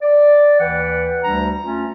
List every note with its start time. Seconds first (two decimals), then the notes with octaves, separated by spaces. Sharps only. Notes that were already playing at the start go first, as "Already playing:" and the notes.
0.02 D5
0.60 D#2 E3 B4 F#5 G5
1.24 D2 G3 D4 A#5
1.63 A3 C#4 F4